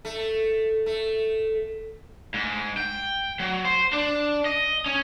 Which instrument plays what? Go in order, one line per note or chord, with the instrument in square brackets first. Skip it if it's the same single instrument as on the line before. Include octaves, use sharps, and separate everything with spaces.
[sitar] A3
A3
[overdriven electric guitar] G#2
G5
F#3
C5
D4
D#5
C#4